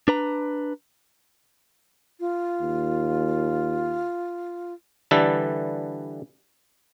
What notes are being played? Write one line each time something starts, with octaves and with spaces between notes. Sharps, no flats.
D4 B4 A#5
F4
D#2
D3 E3 G3 A4 B4